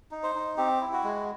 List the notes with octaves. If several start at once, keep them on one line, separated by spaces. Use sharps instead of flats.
D#4
C5
D#4
C4 G4
E4
F#4
G#3